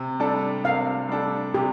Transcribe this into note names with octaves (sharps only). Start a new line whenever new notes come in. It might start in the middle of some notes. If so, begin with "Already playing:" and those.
Already playing: C3
G3 D4 A4
C3 F5
G3 D4 A4
C3 G4